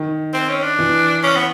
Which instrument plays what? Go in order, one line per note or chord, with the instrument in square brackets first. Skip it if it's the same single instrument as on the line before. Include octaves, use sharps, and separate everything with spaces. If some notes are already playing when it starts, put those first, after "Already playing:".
Already playing: [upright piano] D#3
[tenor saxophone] C4
C#4
D4
[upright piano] E3
[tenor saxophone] C#4
B3